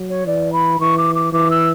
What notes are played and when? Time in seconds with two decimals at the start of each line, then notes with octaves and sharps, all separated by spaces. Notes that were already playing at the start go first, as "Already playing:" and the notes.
Already playing: F#3
0.09 C#5
0.27 E3 D5
0.52 B5
0.80 E3 C#6
0.97 D6
1.15 D6
1.33 E3 D6
1.50 E6